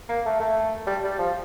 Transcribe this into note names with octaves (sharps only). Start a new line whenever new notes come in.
A#3
A3
A3
G3
G3
F3